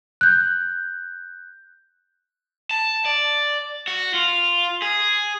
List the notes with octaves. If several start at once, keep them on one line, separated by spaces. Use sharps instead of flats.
F#6 G6
A5
D5
F#4
F4
G#4